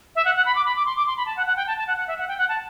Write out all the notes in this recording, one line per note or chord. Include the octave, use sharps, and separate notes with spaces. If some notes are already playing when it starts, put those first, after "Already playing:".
E5
F#5
F#5
B5
D6
B5
D6
C6
D6
C6
B5
A5
F#5
F#5
G5
A5
A5
F#5
F#5
E5
F#5
G5
F#5
A5